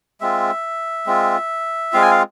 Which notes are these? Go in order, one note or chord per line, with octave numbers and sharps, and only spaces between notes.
G#3 C4 F4 E5
G#3 C4 F4
G#3 C4 F4 F5
G#5
F5